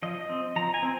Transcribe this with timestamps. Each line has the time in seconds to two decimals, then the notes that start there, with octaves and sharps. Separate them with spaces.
0.03 F3 D#5
0.30 C4
0.56 F3 A#5
0.74 G#5
0.83 C4